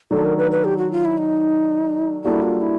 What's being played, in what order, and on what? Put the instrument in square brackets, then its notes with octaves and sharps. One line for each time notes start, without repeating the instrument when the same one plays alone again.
[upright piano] D#3 F#3 A3 D4 [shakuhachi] A4
[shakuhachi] A#4
B4
B4
G4
F#4
F4
E4
D#4
[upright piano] G3 A#3 D4 F#4 A4 [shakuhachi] E4
[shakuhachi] F4
E4